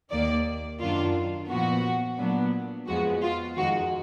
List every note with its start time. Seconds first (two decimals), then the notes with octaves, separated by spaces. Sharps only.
0.11 D#2 D#3 A#3 D5
0.79 F#2 D#3 F#3 D4 F4
1.49 A#2 F3 B3 F#4
2.18 A#2 F#3 B3 D4
2.87 F2 F3 G#3 B3 F#4
3.22 F4
3.57 F2 D#3 G#3 F#4